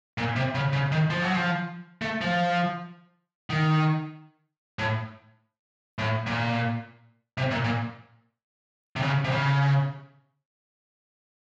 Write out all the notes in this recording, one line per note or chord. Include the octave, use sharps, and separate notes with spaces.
A#2
C3
C#3
C#3
D#3
F3
F#3
F3
A3
F3
D#3
A2
A2
A#2
C3
A#2
A#2
C3
C#3
C3
C#3